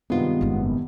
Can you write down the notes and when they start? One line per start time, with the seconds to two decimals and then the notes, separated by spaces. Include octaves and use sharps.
0.10 G2 C3 D#3 G#3 B3 F4
0.41 F#1 G#2